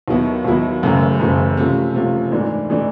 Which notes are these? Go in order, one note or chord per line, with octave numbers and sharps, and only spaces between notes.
D#2 D#3 F#3 B3 E4
D#2 D#3 F#3 B3 E4
F#1 F#2 C#3 E3 A3
F#1 F#2 C#3 E3 A3
C3 F3 A3 C#4
C3 F3 A3 C#4
G#2 E3 A3 D4
E3 A3 D4